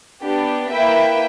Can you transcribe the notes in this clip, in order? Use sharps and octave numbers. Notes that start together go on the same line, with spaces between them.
B3 D4 G4
A#3 E4 B4 E5 G5